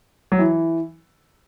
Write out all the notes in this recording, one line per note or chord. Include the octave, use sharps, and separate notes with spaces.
F#3
E3